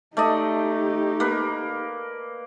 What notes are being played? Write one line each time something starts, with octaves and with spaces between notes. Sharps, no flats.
A3 D#4 G4 D5 D#5
A#3 B4